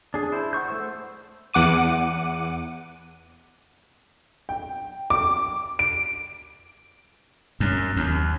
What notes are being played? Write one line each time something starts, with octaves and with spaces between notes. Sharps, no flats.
D4 G#4
E4 C5
F#5 C6 C#6 G6
A3 C5 E6
E2 F#5 D6 D#7
G5
D6
D7
F#2
D#2